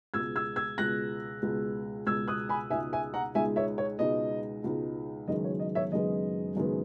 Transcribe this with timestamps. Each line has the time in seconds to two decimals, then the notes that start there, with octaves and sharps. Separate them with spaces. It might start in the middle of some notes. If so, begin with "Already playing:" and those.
0.14 C#2 B2 G#3 E6 G#6
0.36 E6 G#6
0.56 E6 G#6
0.78 C#2 B2 G#3 F#6 A#6
1.42 C#2 B2 G#3
2.06 C#2 B2 G#3 E6 G#6
2.28 D#6 F#6
2.49 G#5 B5
2.70 C#2 B2 G#3 D#4 E5 G#5
2.93 E5 G#5
3.14 F#5 A#5
3.35 C#2 B2 G#3 D#4 E5 G#5
3.56 C#5 E5
3.78 C#5
3.99 C#2 B2 G#3 D#4 D#5
4.64 C#2 B2 G#3 D#4
5.28 F#1 F#2 D#3 G#3 B3 D#5
5.44 C#5
5.60 D#5
5.75 C#5 E5
5.92 F#1 F#2 D#3 G#3 B3 D#5
6.56 F#1 F#2 D#3 G#3 B3